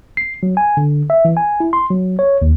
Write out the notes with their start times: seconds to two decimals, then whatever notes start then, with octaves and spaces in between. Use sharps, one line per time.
0.17 C7
0.43 F#3
0.57 G#5
0.77 D3
1.10 E5
1.25 E3
1.37 G#5
1.60 E4
1.73 C6
1.91 F#3
2.19 C#5
2.42 D#2